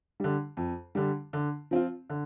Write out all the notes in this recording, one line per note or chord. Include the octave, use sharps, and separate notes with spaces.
D3 G3
F2
D3 G3
D3
F3 C4 F4
D3